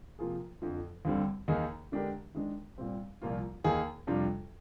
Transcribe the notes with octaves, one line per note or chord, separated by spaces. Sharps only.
C3 F3 A#3 F4 G#4
F2 D3 F3
D#2 D3 G3 C4
D#2 D#3 A#3 D#4 G#4
D3 G#3 D4 G4 A#4
D#3 G#3 D4
A#2 G3 C4
C2 A#2 F3 A#3 F4
D#2 D#3 A#3 D#4 G#4
F2 C3 G3 D4 F4